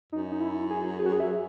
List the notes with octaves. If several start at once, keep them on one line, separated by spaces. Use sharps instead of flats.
F#2 D#4
D#4
E4
G#4
G#4
F#4
G#4
E5